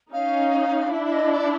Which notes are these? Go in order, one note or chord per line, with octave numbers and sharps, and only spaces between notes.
C#4 D#4 F5
D4 E4 E5
E5
D#5
D5